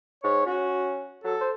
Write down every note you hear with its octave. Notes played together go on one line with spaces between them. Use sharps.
G#2 C#5
C#4 F#4
F#3 A4
C5